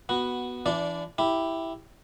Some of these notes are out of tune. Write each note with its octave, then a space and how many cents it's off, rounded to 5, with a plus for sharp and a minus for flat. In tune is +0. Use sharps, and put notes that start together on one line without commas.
B3 -5 F#4 +0
E3 +30 D4 -15 D5 +0
E4 +0 G4 +0